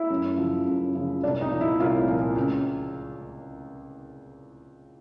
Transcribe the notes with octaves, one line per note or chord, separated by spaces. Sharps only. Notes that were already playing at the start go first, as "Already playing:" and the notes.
Already playing: E4 E5
F#2
C#3 F3
F#2
C#3 F3
C2 D4 D5
D#4 D#5
A#2 F3
E4 E5
C2 F4 F5
A#2 F3
C#2